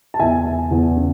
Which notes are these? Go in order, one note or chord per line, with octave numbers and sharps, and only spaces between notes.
A5
E2 E5 G#5
E2
E2
C#3